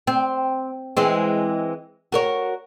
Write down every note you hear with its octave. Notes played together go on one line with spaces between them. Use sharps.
C4
E3 G#3 C4
F#4 A#4 C#5